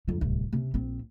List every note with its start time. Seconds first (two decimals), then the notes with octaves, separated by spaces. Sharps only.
0.08 F2 D3
0.21 D1 C2
0.53 C3 C#4
0.74 A#1 C4